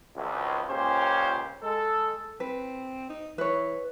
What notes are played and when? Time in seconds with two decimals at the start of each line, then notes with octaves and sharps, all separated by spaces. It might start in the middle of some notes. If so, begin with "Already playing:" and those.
0.16 G#1 C#2
0.70 C#2 A#2 C#4 G4 C5
1.63 G#3 A4
2.40 C4 B4
3.10 D#4
3.38 E3 B4 C#5